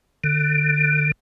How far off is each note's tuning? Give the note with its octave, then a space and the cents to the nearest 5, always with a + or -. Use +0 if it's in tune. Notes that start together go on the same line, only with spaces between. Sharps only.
D3 +25